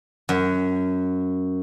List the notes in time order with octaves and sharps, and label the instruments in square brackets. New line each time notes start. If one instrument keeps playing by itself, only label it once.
[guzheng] F#2